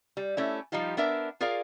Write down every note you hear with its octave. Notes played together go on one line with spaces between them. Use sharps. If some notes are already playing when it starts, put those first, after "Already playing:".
G3
A3 C#4 E4
F3 G3 D#4 F4 G4
B3 D4 A#4 E5
F4 G#4 A#4 D5 F5